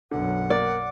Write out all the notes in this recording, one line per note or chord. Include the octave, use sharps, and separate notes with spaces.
B1 F#2 D3 F#5
A#3 D5